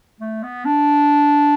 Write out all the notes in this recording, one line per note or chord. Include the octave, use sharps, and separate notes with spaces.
A3
B3
D4